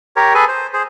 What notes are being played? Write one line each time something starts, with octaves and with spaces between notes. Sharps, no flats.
G4 A#4 C#5
G#4 A4 B4 G#5
C5
G#4 C5